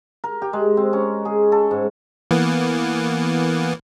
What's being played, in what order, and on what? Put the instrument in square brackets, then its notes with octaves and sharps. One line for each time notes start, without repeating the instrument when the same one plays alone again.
[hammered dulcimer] A#4
G4
G#3
C4
C#4
G#4
A4
G#2
[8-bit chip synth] E3 A#3 B3